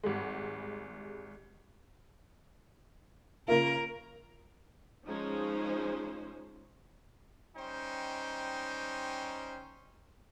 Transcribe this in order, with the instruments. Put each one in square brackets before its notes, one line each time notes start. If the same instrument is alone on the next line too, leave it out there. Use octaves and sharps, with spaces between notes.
[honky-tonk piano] G#1 G3 G#3
[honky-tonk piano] C#3 A#3 F4 [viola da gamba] A#4
[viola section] F3 G#3 C#4 D#4 C5
[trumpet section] G3 C#4 D#4 C5 G5